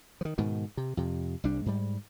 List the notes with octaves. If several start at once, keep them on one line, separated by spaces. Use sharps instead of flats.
D#3 F3
G#2 B2 D#3
C3
F2 C3
C2 G3 D4
G#2 G3